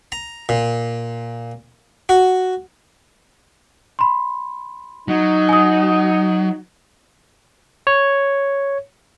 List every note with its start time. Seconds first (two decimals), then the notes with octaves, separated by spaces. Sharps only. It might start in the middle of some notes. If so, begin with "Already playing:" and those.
0.12 A#5
0.49 A#2
2.09 F#4
3.99 B5 C6
5.08 F#3 D#4
5.49 G#5 D#6
7.87 C#5